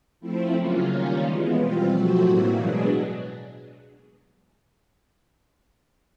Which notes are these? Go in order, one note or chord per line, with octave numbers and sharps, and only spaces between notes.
F3 A3 C4 E4
C#3 F#3 A#3 C#4 F4
D#3 G3 A#3 C#4 F4
E3 G#3 B3
B2 G3 C4 F4
F3 F#3 A3 C4 F#4
A2 E3 G3 A#3
B2 F#3 G#3 B3 D4 G#4